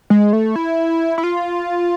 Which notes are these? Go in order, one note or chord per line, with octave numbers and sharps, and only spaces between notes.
G#3
A3
E4
E4
F4